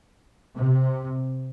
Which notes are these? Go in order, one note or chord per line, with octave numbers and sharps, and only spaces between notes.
C3